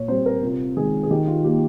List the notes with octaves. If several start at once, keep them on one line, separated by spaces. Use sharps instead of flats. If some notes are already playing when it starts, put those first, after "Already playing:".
Already playing: A#2 C#5
G3 C4 C5
A#4
C3 F4
D#3 G#3 G#4
G#4
D#3 G4
F4
A#3 G4